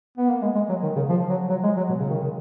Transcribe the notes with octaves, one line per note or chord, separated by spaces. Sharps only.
B3
A#3
G#3
G#3
F#3
D#3
C#3
F3
F#3
F#3
G#3
F#3
B2
C#3
D#3
C#3